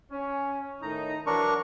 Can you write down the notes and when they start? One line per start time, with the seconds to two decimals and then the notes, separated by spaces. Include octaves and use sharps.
0.12 C#4
0.82 A2 D#3 D#4 A#5
1.26 E3 F#3 D4 A#4 C#6